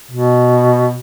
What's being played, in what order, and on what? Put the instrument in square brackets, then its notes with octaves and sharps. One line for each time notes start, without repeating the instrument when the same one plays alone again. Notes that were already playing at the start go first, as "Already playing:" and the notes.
[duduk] B2